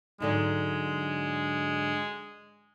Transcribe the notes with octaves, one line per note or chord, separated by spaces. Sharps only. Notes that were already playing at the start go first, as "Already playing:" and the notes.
G#2 D3 F#3 G#3